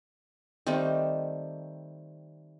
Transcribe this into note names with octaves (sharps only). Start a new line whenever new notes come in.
D#3 G3 A3 C4